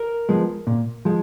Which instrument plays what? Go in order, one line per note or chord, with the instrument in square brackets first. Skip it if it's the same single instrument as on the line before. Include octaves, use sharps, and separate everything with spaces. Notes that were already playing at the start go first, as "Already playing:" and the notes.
Already playing: [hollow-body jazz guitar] A#4
F3 G#3 B3
A#2
F3 G#3